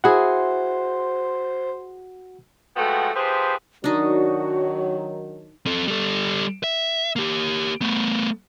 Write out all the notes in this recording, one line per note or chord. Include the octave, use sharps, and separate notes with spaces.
E4 F#4 G#4 C5 F#5
F3 G#3 A3 B3 F#4 G5
F3 G4 G#4 B4 C5
D#3 F#3 D4 D#4 F#4
C4 A4
G3 A4
E5
A#3 G4
A3 B3